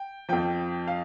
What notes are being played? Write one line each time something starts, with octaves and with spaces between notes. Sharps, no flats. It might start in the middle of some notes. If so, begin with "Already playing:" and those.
Already playing: G5
F2 F3 G5
F5